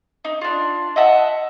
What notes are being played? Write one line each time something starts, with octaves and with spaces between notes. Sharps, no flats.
D#4
D4 F4
D#5 E5 F#5 A5